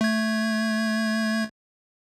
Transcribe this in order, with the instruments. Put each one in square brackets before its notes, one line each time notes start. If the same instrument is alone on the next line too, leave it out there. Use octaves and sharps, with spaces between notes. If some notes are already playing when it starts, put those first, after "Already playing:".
[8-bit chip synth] A3 G#6